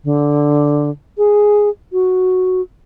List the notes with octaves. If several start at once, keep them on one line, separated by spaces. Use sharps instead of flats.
D3
G#4
F#4